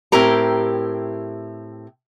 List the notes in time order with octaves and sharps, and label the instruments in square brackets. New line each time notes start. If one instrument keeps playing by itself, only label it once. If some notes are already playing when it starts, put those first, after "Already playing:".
[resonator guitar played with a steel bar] A2 C4 E4 G4 A#4 A#5